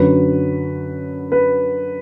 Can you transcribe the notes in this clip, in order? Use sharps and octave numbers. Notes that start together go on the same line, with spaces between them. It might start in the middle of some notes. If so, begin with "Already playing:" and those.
Already playing: F#2 D3 F#3 B4
B4